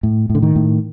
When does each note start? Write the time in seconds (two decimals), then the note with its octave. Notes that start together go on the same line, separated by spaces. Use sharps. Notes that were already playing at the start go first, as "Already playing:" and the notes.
0.03 A2
0.30 A2
0.35 D3
0.43 D#3
0.56 A2